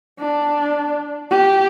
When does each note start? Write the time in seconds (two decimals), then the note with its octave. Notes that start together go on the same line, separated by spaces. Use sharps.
0.20 D4
1.31 G4